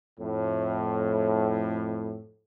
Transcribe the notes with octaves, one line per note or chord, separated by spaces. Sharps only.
F2 A2